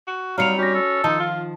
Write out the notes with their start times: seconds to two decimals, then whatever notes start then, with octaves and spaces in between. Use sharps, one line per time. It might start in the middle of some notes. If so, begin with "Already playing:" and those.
0.07 F#4
0.38 F#3 G3 C4 D#4 F5 A#5 C#7 F7
0.58 C#4 F#4 G4 A#6
0.75 A4
1.04 D#3 F3 D#4 A5
1.20 F4